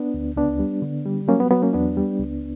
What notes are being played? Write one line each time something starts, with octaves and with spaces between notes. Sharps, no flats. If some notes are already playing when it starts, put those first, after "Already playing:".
Already playing: B3 D4
D2
C#2 B3 D4
G3
D3
G3
F#3 A#3 C#4
B3
F#3 B3
A#3 C#4
E2 B3 D4
G3
C#2